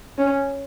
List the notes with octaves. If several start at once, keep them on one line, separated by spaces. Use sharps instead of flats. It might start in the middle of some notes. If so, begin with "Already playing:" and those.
C#4